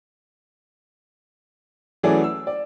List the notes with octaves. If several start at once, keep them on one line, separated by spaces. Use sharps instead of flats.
E3 F#3 A3 C#4 G#4 D5
E6
D5